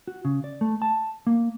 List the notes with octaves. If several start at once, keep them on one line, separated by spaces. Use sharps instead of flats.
F#4
C#3
D5
A3
A5
A#3